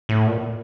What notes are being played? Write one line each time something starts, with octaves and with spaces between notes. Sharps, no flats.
A2
A#2